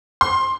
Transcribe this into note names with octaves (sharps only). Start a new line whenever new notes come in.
C6